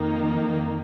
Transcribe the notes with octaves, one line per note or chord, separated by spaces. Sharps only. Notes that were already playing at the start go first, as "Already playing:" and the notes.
Already playing: F2 D#3 A#3 D#4